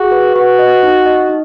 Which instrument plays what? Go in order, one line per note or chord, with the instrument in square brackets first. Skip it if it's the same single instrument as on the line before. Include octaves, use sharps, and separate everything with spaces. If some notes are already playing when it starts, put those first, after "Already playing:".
Already playing: [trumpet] F#4 [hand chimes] G#4
[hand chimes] B4
[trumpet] F#4 [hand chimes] B4
[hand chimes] D#5
D#4
D#5
D#4